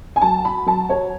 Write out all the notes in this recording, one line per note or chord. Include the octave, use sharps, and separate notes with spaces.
G#5
F#3 A5
B5
F#3 A5
C#5